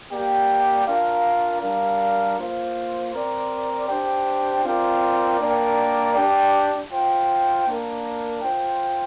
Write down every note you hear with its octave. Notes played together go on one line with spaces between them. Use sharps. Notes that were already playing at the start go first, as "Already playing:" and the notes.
A#3 G4 D5 G5
D4 F4 A#4 F5
G3 D4 A#4 F5
A#3 F4 C5
C4 A#4 D5
D4 G4 C5 G5
C4 F4 A#4 D5 G5
A#3 D4 A#4 D5 G5
D4 G4 D5 G5
F4 C5 G5
A#3 D4 A#4
F4 C5 G5